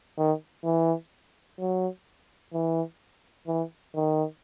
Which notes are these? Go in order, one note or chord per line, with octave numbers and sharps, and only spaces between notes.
D#3
E3
F#3
E3
E3
D#3